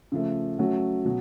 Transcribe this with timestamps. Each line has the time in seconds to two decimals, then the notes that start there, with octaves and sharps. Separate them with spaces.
0.12 C#3 F3 A3
0.59 F#3 A3 C#4 F#4
1.05 B2 F#3